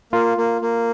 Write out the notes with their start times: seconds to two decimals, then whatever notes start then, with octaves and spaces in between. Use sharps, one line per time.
0.13 A#3 F4
0.37 A#3
0.61 A#3